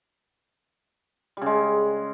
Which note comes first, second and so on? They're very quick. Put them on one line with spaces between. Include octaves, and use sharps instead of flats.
G3 C#3 G#3